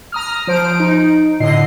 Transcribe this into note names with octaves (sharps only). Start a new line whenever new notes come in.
A#5 D#6 F6
F3 C5 D7
D#4
A2 D3 D#5 C7